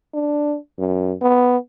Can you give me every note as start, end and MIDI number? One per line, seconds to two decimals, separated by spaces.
0.14 0.57 62
0.79 1.14 42
1.22 1.57 59